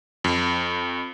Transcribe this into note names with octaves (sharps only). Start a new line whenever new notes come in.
F2